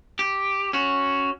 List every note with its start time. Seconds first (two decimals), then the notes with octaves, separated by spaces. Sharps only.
0.19 G4
0.73 C#4 F#4